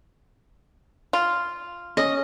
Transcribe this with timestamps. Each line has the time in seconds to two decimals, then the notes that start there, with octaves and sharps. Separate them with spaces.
1.13 F4
1.97 C#4 D#5